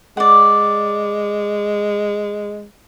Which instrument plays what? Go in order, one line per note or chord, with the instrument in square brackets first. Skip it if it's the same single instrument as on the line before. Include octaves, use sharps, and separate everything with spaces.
[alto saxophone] G#3 [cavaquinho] D5 F#5